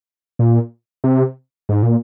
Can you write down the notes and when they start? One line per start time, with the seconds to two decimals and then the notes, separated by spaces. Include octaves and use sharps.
0.39 A#2
1.04 C3
1.69 G#2
1.83 A#2